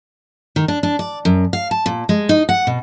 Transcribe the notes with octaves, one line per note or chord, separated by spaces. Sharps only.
D#3
D4
D4
D5
F#2
F5
A5
A#2
G#3
D#4
F#5
B2